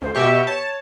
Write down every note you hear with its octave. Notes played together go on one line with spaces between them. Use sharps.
D2 C5
B2 G4 E5 C#6
C#5 A5